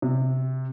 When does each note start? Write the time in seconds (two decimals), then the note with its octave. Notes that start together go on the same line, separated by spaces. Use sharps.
0.02 C3